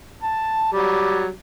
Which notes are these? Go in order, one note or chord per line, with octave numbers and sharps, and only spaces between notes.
A5
F#3 G3